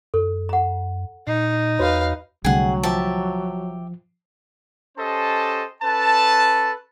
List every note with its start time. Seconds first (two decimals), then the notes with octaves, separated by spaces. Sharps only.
0.14 F#2 A4
0.49 F#5 A#5
1.27 A#2 D#4
1.79 E2 F#4 B4 C#5 F5
2.45 C2 D3 F#3 A3 G#4 F#5 G5
2.83 F3 G4 E5 A5
4.98 C#4 G4 A4 C5 D#5 A5
5.82 C#4 A4 B4 A5